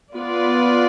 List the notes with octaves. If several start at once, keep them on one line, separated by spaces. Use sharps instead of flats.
B3 F4 B4 D5